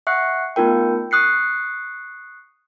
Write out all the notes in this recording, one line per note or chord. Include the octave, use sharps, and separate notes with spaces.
E5 F#5 C#6 F#6 C7 C#7
A3 B3 D#4 F4 A#4 G5
C#6 D#6 F#6 C7 C#7